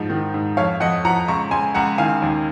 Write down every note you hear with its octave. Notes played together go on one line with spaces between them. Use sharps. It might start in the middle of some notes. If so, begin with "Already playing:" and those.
Already playing: G#2 F3
D#3
G#2
F2 C#5 F5
F2 D#5 F#5
F3 F#5 A#5
C#2 A#5 C#6
C#2 G#5 C6
C#2 F#5 A#5
D#3 F5 G#5
D#2